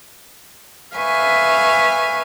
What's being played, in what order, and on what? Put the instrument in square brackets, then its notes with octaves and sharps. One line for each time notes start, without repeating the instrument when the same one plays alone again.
[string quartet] B4 E5 F5 G#5 C#6